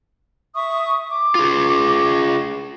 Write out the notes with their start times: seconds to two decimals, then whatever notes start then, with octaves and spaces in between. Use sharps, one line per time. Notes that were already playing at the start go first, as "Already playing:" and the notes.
0.55 E5 C#6 D#6
1.10 D6
1.35 F4 G#4